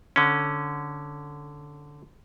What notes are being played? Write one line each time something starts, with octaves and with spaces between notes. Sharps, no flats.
D3 C#4